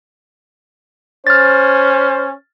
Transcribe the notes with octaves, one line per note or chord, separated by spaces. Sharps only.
C#4 C5 F6 A6